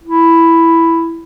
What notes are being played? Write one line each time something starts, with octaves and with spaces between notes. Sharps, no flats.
E4